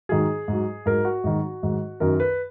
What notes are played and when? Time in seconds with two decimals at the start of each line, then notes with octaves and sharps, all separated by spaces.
0.09 G#2 D#3 F#3 G#4
0.48 G#2 F#3
0.86 G#2 F#3 A#4
1.05 F#4
1.24 G#2 D#3 F#3
1.62 G#2 D#3 F#3
2.00 F#2 D#3 F#3 A#4
2.20 B4